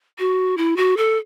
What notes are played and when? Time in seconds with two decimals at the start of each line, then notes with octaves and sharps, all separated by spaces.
0.19 F#4
0.57 E4
0.77 F#4
0.97 A4